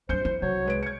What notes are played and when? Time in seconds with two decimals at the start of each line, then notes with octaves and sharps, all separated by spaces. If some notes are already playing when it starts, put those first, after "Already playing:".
0.09 G2 D4 C5 G6 C#7
0.25 E4
0.42 C2 F#3 C#5
0.65 G#3 B4 D7
0.83 G#6 C#7